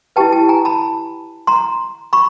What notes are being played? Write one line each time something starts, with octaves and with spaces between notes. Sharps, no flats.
E4 G4 B4 G5 A5
G5 A5
G#5 A#5
A5 B5
A#5 C6
B5 C#6